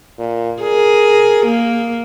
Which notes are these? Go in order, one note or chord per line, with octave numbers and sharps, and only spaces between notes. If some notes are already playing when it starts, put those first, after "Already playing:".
A#2
G#4 A#4
A#3